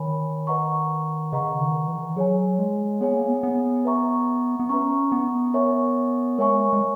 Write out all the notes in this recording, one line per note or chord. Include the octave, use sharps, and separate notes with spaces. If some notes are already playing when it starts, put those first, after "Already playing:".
Already playing: D#3 C#5 G#5 B5
B4 D#5 F#5 A#5 C#6
C#3 B4 D#5 F#5 A#5 C#6
D#3
E3
F#3 G#4 C#5 G#5
G#3
B3 G#4 C#5 G#5
A#3
B3
B3
B4 E5 A#5 C#6
B3
C#4 B4 E5 A#5 C#6
B3
A#4 C#5 E5 G#5 C#6
G#3 A#4 C#5 E5 G#5 C#6
G#3